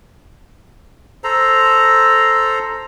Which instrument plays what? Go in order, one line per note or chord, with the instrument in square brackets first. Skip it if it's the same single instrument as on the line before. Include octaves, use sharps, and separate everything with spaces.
[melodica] A4 C5 A#5